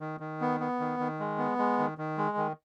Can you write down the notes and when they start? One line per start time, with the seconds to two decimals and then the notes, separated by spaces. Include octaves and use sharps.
0.01 D#3
0.20 D#3
0.41 B3
0.60 B3
0.80 D#3
0.99 D#3
1.20 G#3
1.38 B3
1.58 G#3
1.79 D#3
1.98 D#3
2.18 G#3
2.37 D#3